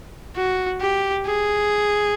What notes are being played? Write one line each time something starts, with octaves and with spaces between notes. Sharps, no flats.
F#4
G4
G#4